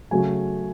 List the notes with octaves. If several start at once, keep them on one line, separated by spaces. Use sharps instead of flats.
C#3 F#3 A3 G#5